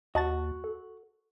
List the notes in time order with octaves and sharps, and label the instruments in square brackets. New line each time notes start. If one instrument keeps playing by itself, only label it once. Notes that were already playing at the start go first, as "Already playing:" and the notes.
[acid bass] D#2 [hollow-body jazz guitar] F#4 [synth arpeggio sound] D#5 A5 A6
[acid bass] A4